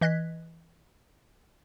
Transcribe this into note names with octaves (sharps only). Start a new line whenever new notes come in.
E3 D#5 F#6 G#6 B6